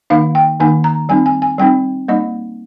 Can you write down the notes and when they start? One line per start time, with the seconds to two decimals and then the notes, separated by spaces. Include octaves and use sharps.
0.10 D#3 A#3 D#4 F5
0.35 G5
0.60 D#3 A#3 D#4 G#5
0.84 A#5
1.09 G3 C4 D#4 G#5
1.26 G#5
1.42 G#5
1.58 G3 C4 D#4 G5
2.08 G3 A#3 D#4 D#5